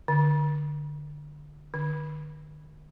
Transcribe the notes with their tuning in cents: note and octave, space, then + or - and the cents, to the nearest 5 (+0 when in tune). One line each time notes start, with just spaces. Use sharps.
D3 +10
D3 +45